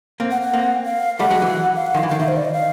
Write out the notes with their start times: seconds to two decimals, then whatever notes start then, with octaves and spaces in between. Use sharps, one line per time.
0.20 A#3 C4
0.31 F#5
0.42 F#5
0.53 A#3 C4
0.86 F5
1.19 G3 A3 F#5
1.31 F#3 G#3
1.42 E3 F#3
1.76 F5
1.87 F#5
1.94 D#3 F3
1.98 F5
2.03 E3
2.08 D#3 F5
2.20 D#3 E5
2.28 C5
2.36 D5
2.45 D#5
2.53 F5